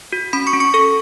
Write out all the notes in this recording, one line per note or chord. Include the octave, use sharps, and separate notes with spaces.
F#4
C#4 B5 B6
C#6 C#7
C#4
C#6 C#7
A4 C#6 C#7